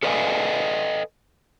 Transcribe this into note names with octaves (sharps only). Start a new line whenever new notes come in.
A4 B4 D5 D#5 F5 G#5